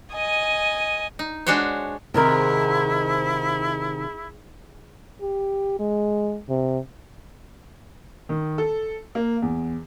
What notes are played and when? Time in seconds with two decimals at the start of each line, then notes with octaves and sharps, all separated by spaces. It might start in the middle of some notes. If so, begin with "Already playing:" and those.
0.13 D#5 G#5
1.19 D#4
1.47 G#3 D4 F#4 C5 C#5
2.14 G#2 C3 D#3 E4 A#4
5.21 G4
5.80 G#3
6.49 C3
8.29 D#3
8.58 A4
9.15 A#3
9.42 E2